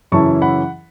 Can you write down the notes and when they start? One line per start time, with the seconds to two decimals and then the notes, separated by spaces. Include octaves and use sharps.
0.12 F#2 C#3 E3 C#4 E4 A5 C#6
0.42 F#5 B5